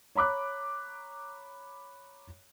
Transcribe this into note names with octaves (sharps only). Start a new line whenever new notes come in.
C#5 A#5 B5 D6 F#6